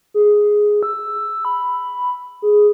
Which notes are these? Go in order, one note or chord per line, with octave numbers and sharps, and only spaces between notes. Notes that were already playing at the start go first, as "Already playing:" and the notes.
G#4
E6
B5
G#4